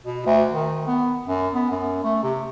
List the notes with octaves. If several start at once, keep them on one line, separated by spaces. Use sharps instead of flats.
B2
D2
D#3
B3
F#2
B3
F#2
A3
C3